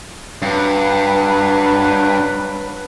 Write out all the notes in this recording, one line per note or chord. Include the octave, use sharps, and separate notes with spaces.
G2 F#3 D4 B4